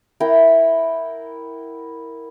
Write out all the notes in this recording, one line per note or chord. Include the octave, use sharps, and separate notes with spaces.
E4 A#4 F#5 G5